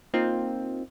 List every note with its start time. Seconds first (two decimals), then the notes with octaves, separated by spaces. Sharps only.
0.14 A#3 C4 D#4 F4